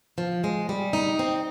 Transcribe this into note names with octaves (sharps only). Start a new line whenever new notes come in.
F3
G#3
G3
D#4
C4